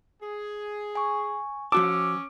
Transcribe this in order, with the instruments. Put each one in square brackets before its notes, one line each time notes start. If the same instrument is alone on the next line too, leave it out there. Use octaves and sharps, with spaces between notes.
[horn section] G#4
[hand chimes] G#5 C#6
[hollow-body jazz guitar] F3 F#4 A5 [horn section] C#4 [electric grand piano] D6 [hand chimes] E6